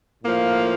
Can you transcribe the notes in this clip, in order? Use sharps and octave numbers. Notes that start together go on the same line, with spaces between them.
A2 F3 A#3